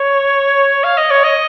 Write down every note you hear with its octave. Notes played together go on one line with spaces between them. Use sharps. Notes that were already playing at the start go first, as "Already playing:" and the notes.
Already playing: C#5
F5
D#5
C#5
D#5